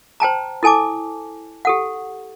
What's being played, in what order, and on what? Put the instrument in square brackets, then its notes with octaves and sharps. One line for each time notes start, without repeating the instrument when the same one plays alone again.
[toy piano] C5 G5 A5 A#5
E4 A4 G#5 A5 D6
G4 A4 F#5